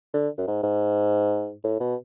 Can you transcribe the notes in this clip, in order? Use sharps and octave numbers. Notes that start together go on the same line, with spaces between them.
D3
F#2
G#2
G#2
A2
B2